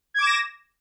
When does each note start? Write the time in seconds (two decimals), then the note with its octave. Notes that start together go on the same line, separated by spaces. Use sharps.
0.14 G#6
0.18 D6
0.22 E7
0.26 A#6